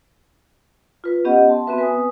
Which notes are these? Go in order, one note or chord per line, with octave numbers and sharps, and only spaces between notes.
F4 B4
B3 C#4 G4 D#5 F#5
A5 C6
B3 C4 F#4 B4 E5
B4 G#5 D#6